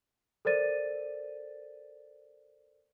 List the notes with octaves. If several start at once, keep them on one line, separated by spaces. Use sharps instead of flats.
A4 A#4 C5 D5 A6 D#7